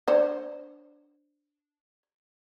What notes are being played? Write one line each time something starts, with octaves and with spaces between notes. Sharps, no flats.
D4 C5 C#5